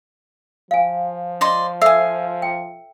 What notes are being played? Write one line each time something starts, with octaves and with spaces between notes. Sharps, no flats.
F3 F5 G#5
D5 D#5 C6
A4 E5 F5 G#5 E6
G5